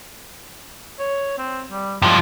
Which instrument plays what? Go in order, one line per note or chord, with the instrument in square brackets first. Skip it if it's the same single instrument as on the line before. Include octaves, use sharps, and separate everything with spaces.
[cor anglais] C#5
C4
G3
[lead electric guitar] G2 F3 [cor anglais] G#3